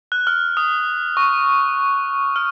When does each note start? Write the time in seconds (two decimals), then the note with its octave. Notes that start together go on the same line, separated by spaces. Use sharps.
0.12 F#6
0.27 F6
0.57 D#6
1.17 C#6
2.36 F6